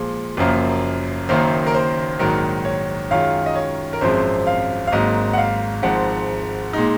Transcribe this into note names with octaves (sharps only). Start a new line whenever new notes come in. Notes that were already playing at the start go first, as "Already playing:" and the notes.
Already playing: A#2 F3 G#3
F#1 F#2 F3 A#3
F#1 F#2 D#3 A#3 C5
A#4
C5
A#1 G#2 D#3 F#3 A#4
C#5
F#2 D#3 G#3 C#4 F4 F5
D#5
C#5
A#4
G#1 F#2 F3 G#3 C4 C5
F5
F5
G#1 G#2 F#3 A#3 D#5
F#5
F5
G#1 G#2 F3 G#3 F#5
A#2 G#3 D#4